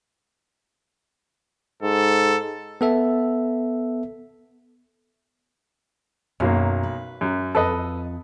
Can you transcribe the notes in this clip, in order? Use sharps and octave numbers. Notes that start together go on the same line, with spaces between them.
G#2 A4
B3 A4 E5
B1 F#2 F#3 A#3
B4
F#2
F2 A4 B4 D#5